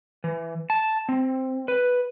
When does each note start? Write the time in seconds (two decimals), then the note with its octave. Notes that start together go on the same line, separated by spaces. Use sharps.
0.24 E3
0.70 A5
1.09 C4
1.68 B4